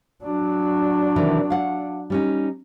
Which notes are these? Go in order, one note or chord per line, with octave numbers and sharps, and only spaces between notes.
F#3 D4
C3 D#3 E3
F5 F#5
G3 C#4 D#4